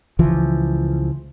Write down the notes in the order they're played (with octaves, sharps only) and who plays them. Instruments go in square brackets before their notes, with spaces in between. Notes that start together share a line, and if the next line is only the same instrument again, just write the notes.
[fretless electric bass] C#2 E3 F3